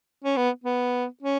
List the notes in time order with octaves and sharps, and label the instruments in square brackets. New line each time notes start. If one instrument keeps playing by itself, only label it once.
[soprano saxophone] C#4
B3
B3
C#4